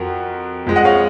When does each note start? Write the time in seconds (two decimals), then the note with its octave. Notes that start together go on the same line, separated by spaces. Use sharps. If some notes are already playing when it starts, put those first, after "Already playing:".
Already playing: F2 F#4 A#4
0.66 F2 F3 G#3
0.76 D#5 F#5
0.85 C#5 F5